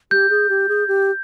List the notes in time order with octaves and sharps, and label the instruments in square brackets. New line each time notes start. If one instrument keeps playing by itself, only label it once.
[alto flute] G4 [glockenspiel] G6
[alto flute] G#4
G4
G#4
G4